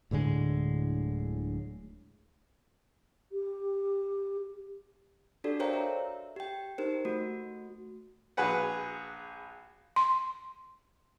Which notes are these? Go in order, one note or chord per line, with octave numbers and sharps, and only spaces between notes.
D1 A2 D3 G#3
G4
D4 F#4 G4 A4 D5
A#4 C5 C#5 F5 G5 A#5
E5
G4 G5
D#4 G4 A#4 C5
A3 F#4
A#1 F#4 G#4 B4 F#5
C6